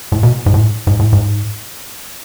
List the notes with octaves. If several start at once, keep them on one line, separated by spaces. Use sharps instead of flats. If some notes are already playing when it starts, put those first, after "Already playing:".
A2
B2
G#2
A2
G#2
A2
G#2